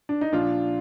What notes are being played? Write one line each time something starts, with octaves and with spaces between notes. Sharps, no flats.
D4
D#4
A#2 F3 D4 F4